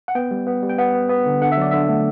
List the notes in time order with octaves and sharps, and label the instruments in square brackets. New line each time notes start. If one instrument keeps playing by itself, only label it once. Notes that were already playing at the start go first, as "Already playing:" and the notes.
[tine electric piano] F#5
B3 G5
G3
B3
G3
G5
B3 F#5
B3
B3
D3
D3 F#5
E5
F#3 D5
D3 E5
A3